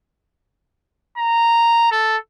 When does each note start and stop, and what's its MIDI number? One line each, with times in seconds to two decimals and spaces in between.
1.18 1.89 82
1.91 2.17 69